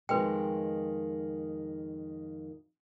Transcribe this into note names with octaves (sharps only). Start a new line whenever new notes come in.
F2 D#3 G#3 B4 G5